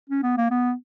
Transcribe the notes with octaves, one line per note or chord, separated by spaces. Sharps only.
C#4
B3
A#3
B3